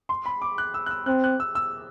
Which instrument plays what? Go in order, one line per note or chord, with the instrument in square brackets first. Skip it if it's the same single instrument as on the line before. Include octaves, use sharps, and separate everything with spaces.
[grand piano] C6
B5
D6
F#6
E6
F#6
E6
[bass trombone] C4 [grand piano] F#6
[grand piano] F#6
E6
E6